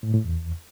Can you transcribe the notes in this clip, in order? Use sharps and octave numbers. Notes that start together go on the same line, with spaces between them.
A2
A2
E2